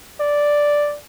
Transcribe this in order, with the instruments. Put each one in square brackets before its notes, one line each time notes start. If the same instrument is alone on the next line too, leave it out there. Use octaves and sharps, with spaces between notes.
[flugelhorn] D5